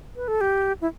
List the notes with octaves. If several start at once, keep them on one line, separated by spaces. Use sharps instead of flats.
B4
A4
G4
E4